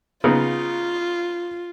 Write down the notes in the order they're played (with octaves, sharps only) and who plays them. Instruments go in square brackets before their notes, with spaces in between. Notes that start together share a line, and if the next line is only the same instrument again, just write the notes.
[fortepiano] C#3 B3 D#4 [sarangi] F4